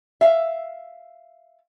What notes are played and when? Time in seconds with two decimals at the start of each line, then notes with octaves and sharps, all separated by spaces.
0.21 E5 F5